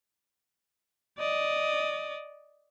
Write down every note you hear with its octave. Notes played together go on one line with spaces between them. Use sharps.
D5 D#5